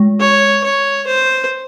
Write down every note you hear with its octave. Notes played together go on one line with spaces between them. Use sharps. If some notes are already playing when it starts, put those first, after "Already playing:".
Already playing: G#3
C#5
C#5
C5